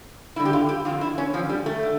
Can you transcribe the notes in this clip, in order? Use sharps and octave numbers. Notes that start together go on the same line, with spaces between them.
G2 D3 E4
G4
F4
G4
F2 D3 F4
E4
C#4
F2 D3 F3
G3
A3
D3